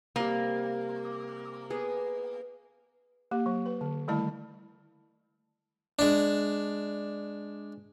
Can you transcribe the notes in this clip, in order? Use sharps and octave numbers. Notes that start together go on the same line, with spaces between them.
C3 G3 A#3
B3 G#4
A#3 G4
F#3
B4
D3
D#3 G3 A3 E4 D#5 A5
G#3 D4